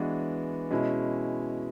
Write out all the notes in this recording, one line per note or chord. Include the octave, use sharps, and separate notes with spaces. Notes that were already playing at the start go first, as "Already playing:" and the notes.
Already playing: E3 G#3 B3 D4 F#4
B2 G#3 C#4 E4